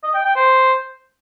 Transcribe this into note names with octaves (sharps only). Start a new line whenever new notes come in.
D#5
G5
G5
C5